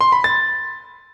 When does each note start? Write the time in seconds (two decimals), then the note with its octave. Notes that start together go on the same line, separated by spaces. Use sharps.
0.01 C6
0.12 B5
0.24 A6